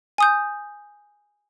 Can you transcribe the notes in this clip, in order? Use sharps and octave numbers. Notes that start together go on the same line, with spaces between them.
G#5 D#6 G6